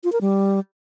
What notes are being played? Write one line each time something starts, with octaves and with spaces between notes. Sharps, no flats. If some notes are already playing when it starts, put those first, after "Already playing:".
F4
A#4
G3